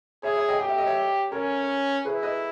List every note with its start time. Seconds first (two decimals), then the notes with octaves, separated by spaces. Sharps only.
0.23 G#4 C#5 E5
0.36 C#5 E5
0.49 D#5 G5
0.59 G4 G5
0.68 E5
0.78 D#5
0.86 C#5 E5
1.32 C#4 A#4 C#5
2.05 E4 G#4 B4
2.23 B4 D#5